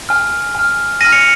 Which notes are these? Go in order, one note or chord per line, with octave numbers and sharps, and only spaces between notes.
G#5 F6
G#5 F6
G#5 F6 A#6 D#7
C#7 F7